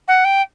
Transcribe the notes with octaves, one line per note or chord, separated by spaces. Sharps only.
F#5
G5